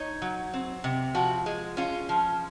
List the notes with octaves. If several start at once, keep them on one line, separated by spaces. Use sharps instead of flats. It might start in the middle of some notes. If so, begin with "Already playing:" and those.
Already playing: D#4 C#5
F#3
C4
C3
F3 F#4
G#3
C#4 F4
F3